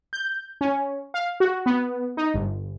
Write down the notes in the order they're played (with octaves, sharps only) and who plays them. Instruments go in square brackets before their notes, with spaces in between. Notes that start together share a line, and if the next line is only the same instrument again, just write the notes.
[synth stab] G6
C#4
F5
F#4
B3
D#4
G1